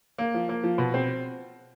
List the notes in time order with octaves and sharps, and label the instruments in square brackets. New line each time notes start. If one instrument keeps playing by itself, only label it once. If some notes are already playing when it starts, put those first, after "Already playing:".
[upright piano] A#3
F3
A#3
F3
B2
C4